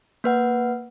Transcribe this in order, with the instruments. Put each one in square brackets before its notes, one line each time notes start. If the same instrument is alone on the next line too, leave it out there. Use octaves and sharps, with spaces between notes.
[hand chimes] A#3 B4 F#5